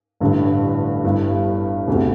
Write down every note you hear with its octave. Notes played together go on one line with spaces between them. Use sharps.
A1 G2 D3
G1 G2 G3 E4
E1 D2 C3